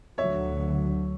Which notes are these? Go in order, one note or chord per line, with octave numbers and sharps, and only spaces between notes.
D2 D3 F#3 C#5 E5